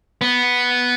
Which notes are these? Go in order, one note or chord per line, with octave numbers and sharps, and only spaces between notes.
B3